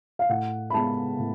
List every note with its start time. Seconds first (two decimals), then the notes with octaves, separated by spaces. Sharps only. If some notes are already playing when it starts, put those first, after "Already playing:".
0.19 F5
0.29 A2 F#5
0.70 B5
0.74 G#3 B3 A5
1.19 A2